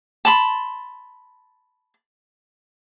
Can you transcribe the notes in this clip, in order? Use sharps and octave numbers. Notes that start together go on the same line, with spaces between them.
A5 B5 C6